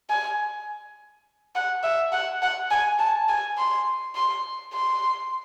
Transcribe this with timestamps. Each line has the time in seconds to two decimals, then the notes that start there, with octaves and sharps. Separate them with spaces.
0.10 G#5
1.55 F#5
1.83 E5
2.12 F#5
2.42 F#5
2.71 G#5
2.99 A5
3.29 G#5
3.58 C6
4.15 C6
4.73 C6